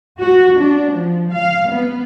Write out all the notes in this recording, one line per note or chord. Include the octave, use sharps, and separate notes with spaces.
F#4
D4
F3
F5
B3